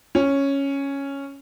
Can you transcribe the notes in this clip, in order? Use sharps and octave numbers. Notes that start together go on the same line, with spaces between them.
C#4